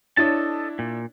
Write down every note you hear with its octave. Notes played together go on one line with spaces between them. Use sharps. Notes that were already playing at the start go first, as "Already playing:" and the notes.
D4 E4 A4 C#5 D#5 A5
A#2